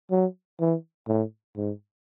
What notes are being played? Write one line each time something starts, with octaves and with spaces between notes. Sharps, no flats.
F#3
E3
A2
G#2